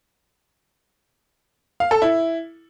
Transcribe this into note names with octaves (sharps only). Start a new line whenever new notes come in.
F5
A4
E4